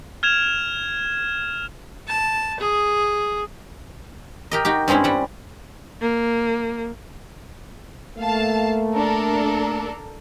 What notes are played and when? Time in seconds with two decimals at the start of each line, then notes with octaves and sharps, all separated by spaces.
0.23 F6 G#6 E7 F7
2.08 A5
2.60 G#4
4.51 G4 A#4 D#5
4.65 D#4 F#4 G4
4.88 G2 G#3 C4 C#4 E4
5.04 G3 F#5
6.01 A#3
8.18 A3 A#3 F5 A5
8.94 D4 A4 A#4